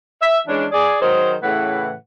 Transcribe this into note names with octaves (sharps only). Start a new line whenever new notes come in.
E5
E3 G#3 C#4 D4
G#4 D5
D#3 F#3 G#4 A#4 C5
A2 C#3 E3 A3 B4 F#5